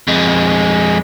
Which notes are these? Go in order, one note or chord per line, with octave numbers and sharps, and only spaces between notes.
F2 G#3